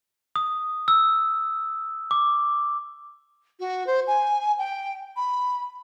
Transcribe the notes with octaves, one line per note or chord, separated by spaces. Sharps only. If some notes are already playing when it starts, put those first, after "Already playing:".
D#6
E6
D6
F#4
C5
G#5
G5
B5